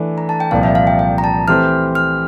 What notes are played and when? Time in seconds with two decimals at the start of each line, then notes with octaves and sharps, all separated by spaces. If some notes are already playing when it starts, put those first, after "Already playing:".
Already playing: E3 A3 D4
0.18 A#5
0.29 A5
0.40 G5
0.51 C2 A#2 F3 F5
0.63 E5
0.75 F5
0.87 G5
0.99 G5
1.18 A#5
1.24 A5
1.47 E3 A3 C4 G4 C5 F6
1.95 F6